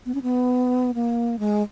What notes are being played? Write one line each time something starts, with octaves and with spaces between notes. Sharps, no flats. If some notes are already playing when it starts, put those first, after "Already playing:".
B3
C#4
B3
A#3
G#3